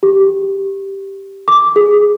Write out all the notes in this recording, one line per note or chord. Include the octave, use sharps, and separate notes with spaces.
G4
D6
G#4